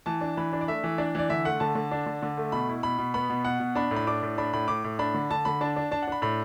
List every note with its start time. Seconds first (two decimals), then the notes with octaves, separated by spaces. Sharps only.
0.06 E3 A5
0.21 D4
0.37 E3 B5
0.53 D4
0.61 D5
0.68 A3 E5
0.84 E3
0.98 D4 D5
1.15 E3 D5
1.29 D3 E5
1.45 A3 F#5
1.60 D3 A5
1.75 D3
1.91 D4
2.06 D3
2.22 D3
2.38 A3
2.52 B2 B5
2.69 E4
2.83 B2 B5
2.98 B2
3.14 B3 B5
3.30 B2
3.45 B2 F#5
3.60 B2
3.75 D4 B5
3.91 A2
3.96 B5
4.07 D4 D6
4.22 A2
4.38 D4 B5
4.53 A2 B5
4.68 A2 D6
4.84 A2
4.99 D4 B5
5.14 D3
5.31 D3 A5
5.45 D3 B5
5.61 D4 A5
5.76 D4
5.91 D4 A5
6.02 F#5
6.08 D4 B5
6.22 A2 B5